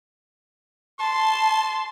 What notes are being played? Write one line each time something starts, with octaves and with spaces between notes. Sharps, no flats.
A5 C6